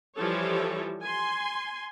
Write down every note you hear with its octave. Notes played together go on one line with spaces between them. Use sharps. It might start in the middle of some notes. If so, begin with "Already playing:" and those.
E3 F3 G3 A4 C#5
G#5 C6